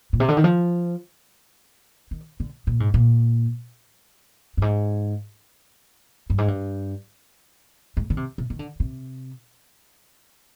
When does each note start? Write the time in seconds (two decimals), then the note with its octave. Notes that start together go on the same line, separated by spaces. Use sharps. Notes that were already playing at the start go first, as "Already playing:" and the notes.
0.13 A#2
0.20 C3
0.28 D3
0.37 D#3
0.44 F3
2.11 D#3
2.40 D3
2.67 A#2
2.80 G#2
2.94 A#2
4.57 G2
4.62 G#2
6.30 G2
6.38 G#2
6.48 G2
7.97 G#2
8.10 D3
8.17 C3
8.38 C3
8.50 D#3
8.59 D3
8.80 C3